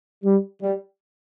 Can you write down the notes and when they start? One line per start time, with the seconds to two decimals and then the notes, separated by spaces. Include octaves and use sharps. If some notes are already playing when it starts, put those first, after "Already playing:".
0.24 G3
0.62 G3